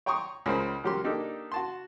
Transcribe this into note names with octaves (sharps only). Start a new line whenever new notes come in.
C#5 G5 A#5 C6 C#6 D#6
C#2 C#3 A#4 C5 B5
C#2 F#3 G4 A#4 C6
A#3 D4 D#4 G4 A4
F#4 A5 C6